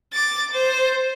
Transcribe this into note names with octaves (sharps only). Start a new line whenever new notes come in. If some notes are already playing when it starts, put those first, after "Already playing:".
D6 A6
C5